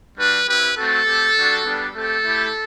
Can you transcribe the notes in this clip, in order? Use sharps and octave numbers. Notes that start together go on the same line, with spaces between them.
G3 D4 F#4 B4
C4 E4 G4 B4
A3 C4 F#4 A4
A3 C4 G4
G3 D4 F#4
G3 B3 D4
A3 C4 G4 A4
A3 E4 G4